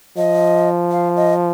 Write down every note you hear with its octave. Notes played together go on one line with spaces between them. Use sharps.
F3 D#5
F5
D#5